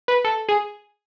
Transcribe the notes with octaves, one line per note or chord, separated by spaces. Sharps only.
B4
A4
G#4